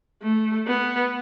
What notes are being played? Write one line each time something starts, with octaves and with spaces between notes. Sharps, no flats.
A3
B3